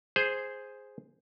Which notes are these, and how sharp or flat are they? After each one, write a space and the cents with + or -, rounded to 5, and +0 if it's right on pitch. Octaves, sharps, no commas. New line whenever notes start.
G#4 +0 C5 +0